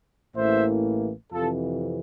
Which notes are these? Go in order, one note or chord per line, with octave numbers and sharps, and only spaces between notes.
A1 A2 E3 A#3 C5 E5
F2 C3 E3 F4 A4